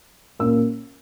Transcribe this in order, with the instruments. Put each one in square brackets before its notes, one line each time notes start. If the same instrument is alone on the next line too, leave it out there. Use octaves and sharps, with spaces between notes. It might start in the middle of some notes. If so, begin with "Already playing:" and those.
[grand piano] A#2 A#3 C#4 E6